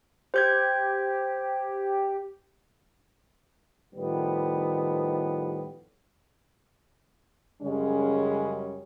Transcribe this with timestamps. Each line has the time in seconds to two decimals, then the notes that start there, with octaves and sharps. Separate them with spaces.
0.34 G4 C5 G6 G#6
3.95 A2 D#3 F3 G3 B3
7.62 F#2 C#3 G3 G#3 C#4